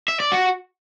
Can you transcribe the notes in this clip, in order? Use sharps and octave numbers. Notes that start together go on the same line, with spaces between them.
E5
D5
F#4